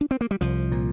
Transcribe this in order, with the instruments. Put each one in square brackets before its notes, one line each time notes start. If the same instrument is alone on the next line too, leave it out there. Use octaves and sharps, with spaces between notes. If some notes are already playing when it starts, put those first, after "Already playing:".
[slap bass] D4
C4
A#3
G3
C2 F3
A#2